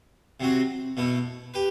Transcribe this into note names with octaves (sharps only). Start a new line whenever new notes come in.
C3 F#3 C4 F#4
B2 A3 E4
G4 B4